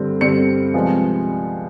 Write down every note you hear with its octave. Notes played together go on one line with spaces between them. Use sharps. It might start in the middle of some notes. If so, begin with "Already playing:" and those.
Already playing: G2 D3 G3 C4
G2 D3 G3 C4 C#7
C2 C3 F3 G#3 B3